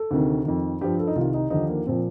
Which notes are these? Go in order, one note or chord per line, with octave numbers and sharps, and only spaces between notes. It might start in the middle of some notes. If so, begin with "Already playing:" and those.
Already playing: A4
D2 C3 D#3
F2 D#3
G2 F3 G4
A4
D#4
C2 C3 D#3 F4
D#4
D#2 D3 F3 D#4
A#3
A#2 F3 C4